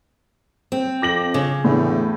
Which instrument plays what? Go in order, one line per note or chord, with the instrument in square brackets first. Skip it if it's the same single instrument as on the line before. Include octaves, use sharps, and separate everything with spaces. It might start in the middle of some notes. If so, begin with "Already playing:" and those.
[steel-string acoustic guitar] C4
[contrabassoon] F2 [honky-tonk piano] D6 A#6 F#7
[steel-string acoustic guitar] C#3
[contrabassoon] E2 [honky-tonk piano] A2 D3